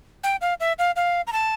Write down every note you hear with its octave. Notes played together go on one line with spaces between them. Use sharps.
G5
F5
E5
F5
F5
A#5
A5